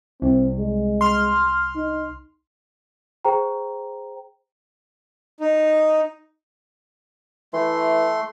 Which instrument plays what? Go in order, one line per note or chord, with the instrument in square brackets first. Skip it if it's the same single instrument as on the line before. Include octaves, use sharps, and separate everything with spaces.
[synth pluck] C2 [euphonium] C4
[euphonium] G#3
[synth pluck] C6 F6
[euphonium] D#4
[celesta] G#4 C5 G5 A#5
[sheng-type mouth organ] D#4
[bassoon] E3 [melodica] A3 C6